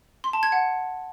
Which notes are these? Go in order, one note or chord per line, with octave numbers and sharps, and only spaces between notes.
C6
A5
G#6
F#5